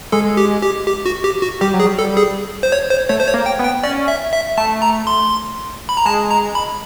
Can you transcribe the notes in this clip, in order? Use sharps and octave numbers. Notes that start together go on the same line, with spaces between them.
G#3 A4
G4
G4
G4
F#4
G4
F#4
G3 G4
F#3
G#4
G3
A4
G#4
C5
C#5
C5
A3 C#5
C5
C#5
A#3
G5
B3
G5
C#4 D5
E5
E5
A3 A5
A#5
C6
B5
A#5
G#3 A5
A#5
B5